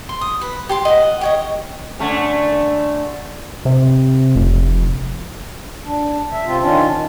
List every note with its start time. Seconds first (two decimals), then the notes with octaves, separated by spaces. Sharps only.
0.09 C6
0.21 D#6
0.41 B4
0.69 G4 A5 C6
0.85 D#5 F#5
1.21 G4 C#5 D#5
1.99 D3 A3 C#4
3.65 C3
4.36 F1
5.85 D4
6.32 E5
6.46 C3 C4 F4
6.61 D#3 C#4 D4 F4
6.90 D#3